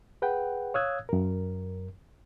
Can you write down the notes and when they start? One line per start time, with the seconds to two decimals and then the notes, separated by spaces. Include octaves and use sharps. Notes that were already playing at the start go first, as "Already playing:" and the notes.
0.22 G#4 B4 F#5 G5
0.74 C#5 F5 D#6 E6 F#6 G#6
1.09 F#2 A#4